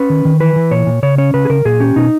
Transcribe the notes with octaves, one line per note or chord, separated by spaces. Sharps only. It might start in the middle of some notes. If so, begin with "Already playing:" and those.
Already playing: C#4 B4
D#3
D#3
E3 B4
E3
A#2 C#5
A#2
C#3 C#5
C#4 C#5
C#3 B4
G#4
C#3 A#4
A#2 G#4
C#4 G4
B2 D#4